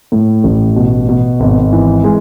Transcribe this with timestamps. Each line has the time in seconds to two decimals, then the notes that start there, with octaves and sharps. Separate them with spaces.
0.12 A2
0.44 A1
0.76 B2
1.09 B2
1.40 G#1
1.72 E3
2.04 G#3